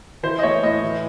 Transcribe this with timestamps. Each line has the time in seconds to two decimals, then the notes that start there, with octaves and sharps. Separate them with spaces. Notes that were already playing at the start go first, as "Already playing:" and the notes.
0.23 E3 C5
0.39 D#5
0.43 A3 C#5
0.63 A2 D#5
0.83 E3